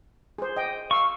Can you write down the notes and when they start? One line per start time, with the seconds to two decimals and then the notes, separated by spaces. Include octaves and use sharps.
0.38 G#4 C5
0.56 D#5 G5
0.91 F5 C#6 E6